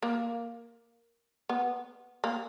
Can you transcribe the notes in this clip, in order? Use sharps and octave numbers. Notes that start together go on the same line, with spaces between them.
A#3
B3
A#3